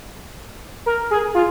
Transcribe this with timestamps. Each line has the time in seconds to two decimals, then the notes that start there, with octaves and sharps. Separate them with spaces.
0.86 A#4
1.11 G#4
1.35 F4